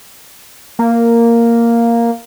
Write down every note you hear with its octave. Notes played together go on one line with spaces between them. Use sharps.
A#3